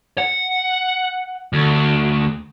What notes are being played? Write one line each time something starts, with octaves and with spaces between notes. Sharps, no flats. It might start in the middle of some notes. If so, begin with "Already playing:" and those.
F#5
D2